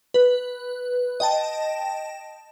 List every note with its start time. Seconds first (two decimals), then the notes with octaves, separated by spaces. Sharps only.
0.14 B4
1.20 D#5 G5 A5